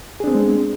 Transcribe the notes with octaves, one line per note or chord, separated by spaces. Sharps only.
G#3 B3 C4 D4 G#4